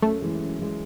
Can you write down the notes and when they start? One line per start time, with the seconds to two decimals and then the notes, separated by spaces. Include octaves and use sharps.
0.02 F#2 A3
0.22 E3 G#3
0.41 F#2
0.59 E3 G#3